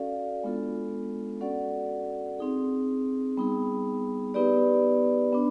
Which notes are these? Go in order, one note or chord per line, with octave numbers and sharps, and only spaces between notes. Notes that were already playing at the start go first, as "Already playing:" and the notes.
Already playing: C#4 F#4 A4 D5 F5
G#3 B3 D4 F4 A4
C#4 F#4 A4 D5 F#5
C4 D#4 G#4
G3 B3 D#4 G#4
B3 D#4 G4 B4 D5
B3 D4